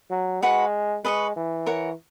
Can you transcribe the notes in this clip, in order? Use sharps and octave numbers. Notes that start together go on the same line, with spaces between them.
F#3
G#3 F#4 B4 F#5 C#6
G#3 B4 D#5 A#5 C#6
E3
A#4 C#5 F#5